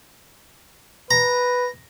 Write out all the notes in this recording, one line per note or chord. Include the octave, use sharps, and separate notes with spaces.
B4 A#5